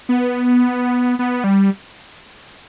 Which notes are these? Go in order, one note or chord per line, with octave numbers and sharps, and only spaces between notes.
B3
B3
G3